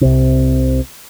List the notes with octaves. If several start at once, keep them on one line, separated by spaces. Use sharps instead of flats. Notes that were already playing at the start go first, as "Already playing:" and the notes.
C2 C3